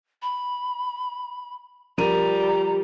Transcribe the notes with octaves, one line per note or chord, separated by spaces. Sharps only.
B5
F3 G3 A#4 A#5 D#7